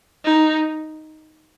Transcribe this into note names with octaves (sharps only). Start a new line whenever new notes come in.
D#4